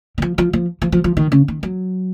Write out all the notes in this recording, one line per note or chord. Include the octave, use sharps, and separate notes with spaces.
D#3
F3
F3
F3
F3
F3
F3
D#3
C#3
D#3
F#3